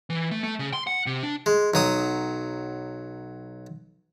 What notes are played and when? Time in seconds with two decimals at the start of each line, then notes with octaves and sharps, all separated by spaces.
0.10 E3
0.31 A3
0.43 A3
0.59 C#3
0.73 C6
0.87 F#5
1.06 C3
1.23 D4
1.46 G#3
1.74 B1 F#3 D#6